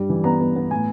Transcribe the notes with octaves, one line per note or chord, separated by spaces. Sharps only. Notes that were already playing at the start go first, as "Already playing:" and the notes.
Already playing: G2 G3
E3
B3 A#5
B3
B3
A2 G#5